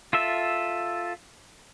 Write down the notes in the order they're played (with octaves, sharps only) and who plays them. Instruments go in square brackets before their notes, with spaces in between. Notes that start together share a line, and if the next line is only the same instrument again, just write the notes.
[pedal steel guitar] F4 A4 E5